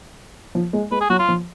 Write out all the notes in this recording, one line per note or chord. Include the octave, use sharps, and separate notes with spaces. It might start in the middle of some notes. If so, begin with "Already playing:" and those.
F3
G#3
G#3 B4
G#4
F#3 F#4
F4
F3